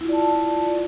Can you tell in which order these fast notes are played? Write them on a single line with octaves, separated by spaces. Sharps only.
E4 F4 D5 A5